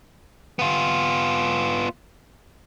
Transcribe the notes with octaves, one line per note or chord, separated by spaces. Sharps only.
B3 F4